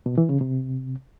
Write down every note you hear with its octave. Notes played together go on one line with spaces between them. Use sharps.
B2
E3
C#3
C3